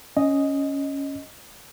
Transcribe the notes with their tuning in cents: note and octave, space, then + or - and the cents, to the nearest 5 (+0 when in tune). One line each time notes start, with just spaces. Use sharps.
C#4 +0 D#5 +0